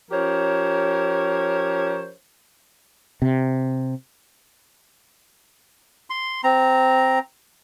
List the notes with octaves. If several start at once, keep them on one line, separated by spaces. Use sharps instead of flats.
F3 C#4 G4 A#4 C5 C#5
C3
C6
C4 A#5